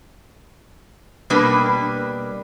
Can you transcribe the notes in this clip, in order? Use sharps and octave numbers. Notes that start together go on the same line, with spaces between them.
B2 G3 A#3 D4 B4